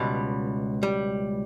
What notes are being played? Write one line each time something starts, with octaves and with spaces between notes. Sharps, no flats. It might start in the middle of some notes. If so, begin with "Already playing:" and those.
Already playing: C#2 B2 G3
G3